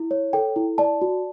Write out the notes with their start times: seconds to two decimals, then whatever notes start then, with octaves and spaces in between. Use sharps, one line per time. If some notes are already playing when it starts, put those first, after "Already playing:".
Already playing: E4
0.11 C#5
0.33 A4 G5
0.56 E4
0.78 D5 A5
1.02 F#4